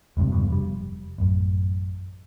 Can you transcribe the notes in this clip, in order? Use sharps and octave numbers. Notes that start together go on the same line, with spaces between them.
F1 C#2 G2 C3
E1 G2 B2
F1 G3
A1 F#2